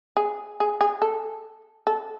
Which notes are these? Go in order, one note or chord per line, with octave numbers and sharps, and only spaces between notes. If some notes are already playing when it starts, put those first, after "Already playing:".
G#4
G#4
G#4
A4
A4